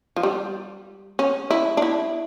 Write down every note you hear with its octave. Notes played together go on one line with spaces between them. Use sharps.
F3
G3
C#4
E4
D4
E4